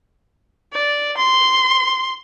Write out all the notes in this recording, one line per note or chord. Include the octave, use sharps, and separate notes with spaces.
D5
C6